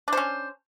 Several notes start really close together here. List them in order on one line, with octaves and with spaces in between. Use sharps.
D4 C5 C#4